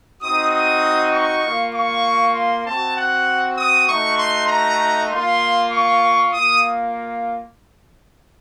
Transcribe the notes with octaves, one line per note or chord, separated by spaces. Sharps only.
C4 D#4 F#4 D#6
D#6
C#6
A#3 F4
C#6
C6
C4 F#4 A5
F#5
D#6
A3 D#4 F#4 C#6
C6
A#5
A#3 F4 C6
C#6
A#3 F4 D#6